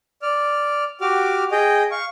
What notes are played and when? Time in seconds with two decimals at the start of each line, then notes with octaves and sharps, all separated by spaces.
0.22 D5 F6
1.01 F#4 G4 D6 F6
1.52 G#4 D#5 G5
1.91 F5 C#6